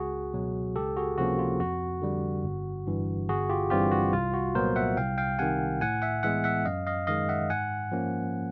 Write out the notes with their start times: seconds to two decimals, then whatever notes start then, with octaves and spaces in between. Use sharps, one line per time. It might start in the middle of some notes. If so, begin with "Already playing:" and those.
Already playing: C#2 F#4 G#4
0.34 B2 F#3
0.76 C#2 G4 A4
0.96 F#4 G#4
1.18 C3 F3 A#3 C#4 F#4
1.39 F4
1.59 F2 F#4
2.02 D3 G3
2.44 G1
2.87 G2 E3
3.29 G1 F#4 G#4
3.50 F4 G4
3.70 G2 E3 G3 C4 F4 G4
3.91 F#4
4.13 C2 F4
4.34 F#4
4.55 A#2 F#3 B3 A#4 C5
4.76 E5 F#5
4.97 C2 F5 G5
5.18 F5 G5
5.39 C3 D#3 F#5 G#5
5.81 A2 F#5 G#5
6.02 E5 F#5
6.23 E3 G#3 B3 E5 F#5
6.44 E5 F#5
6.65 F#2 D#5 F5
6.86 D#5 F5
7.07 D#3 G#3 D#5 F5
7.29 E5 F#5
7.50 G#2 F#5 G#5
7.92 F3 A#3 C#4